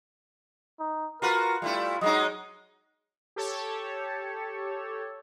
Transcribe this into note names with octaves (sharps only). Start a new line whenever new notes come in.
D#4
F4 F#4 A#4 B4
G3 A3 E4 F4
F#3 G#3 D#4 D#5
G4 A4 C#5 A5